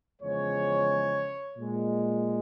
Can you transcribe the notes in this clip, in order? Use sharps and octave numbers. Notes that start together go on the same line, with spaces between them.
E2 C#3 F3 G#3 C#5
A#2 G#3